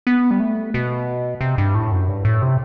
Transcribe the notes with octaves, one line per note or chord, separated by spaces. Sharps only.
B3
G3
A3
B2
C3
G2
A2
F#2
G2
A2
C3